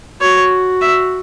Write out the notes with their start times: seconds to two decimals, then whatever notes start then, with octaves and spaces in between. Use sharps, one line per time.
0.21 F#4 C#5
0.81 E5